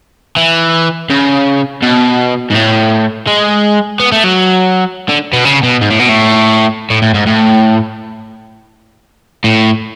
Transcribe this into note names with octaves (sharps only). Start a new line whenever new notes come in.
E3
C#3
B2
G#2
A2
G#3
B3
A3
F#3
D3
B2
C#3
B2
G#2
A2
B2
A2
A2
A2
G#2
A2
A2